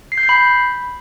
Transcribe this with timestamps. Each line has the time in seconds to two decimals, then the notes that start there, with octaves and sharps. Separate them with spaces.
0.12 C7
0.18 G6
0.23 C7
0.29 B5